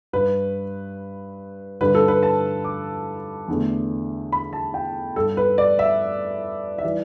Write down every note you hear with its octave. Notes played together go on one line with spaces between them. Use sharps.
G2 G3 B4
G2 D3 G3 B4
A4
B4
A5
D6
E2 D3 A3
B5
A5
G5
G2 G3 A4
B4
D5
E5
E5
E3 G3 D5